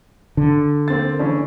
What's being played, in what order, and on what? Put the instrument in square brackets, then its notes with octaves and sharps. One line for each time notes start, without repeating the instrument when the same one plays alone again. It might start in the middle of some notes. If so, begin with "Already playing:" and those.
[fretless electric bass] D3
[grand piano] A#3 C4 A6
E3 C#4 D4